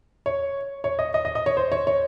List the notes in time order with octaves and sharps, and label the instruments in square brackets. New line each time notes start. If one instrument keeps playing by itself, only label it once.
[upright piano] C#5
C#5
D#5
D#5
D#5
D#5
C#5
C5
C#5
C#5